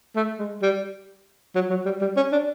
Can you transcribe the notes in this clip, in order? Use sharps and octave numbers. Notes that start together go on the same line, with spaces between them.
A3
G#3
G3
F#3
F#3
G3
G3
C#4
D4